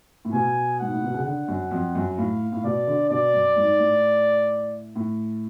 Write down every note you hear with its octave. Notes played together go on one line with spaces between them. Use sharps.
A2
B2 G#5
G#2 F#5
A2
B2
C#3
D3 F#5
F#2
F2
F#2
A2 F5
A2
B2 D5
D3
B2 D5
F#2
G#2
A2
A2